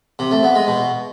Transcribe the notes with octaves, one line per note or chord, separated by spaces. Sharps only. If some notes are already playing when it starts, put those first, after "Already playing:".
C3
A3
B3
G#3
B2